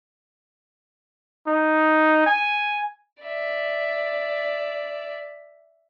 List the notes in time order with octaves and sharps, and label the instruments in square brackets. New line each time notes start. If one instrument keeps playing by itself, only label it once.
[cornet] D#4
G#5
[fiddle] D5 E5